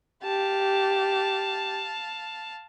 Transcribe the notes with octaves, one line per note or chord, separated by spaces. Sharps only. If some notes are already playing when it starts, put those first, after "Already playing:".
G4 F5 A5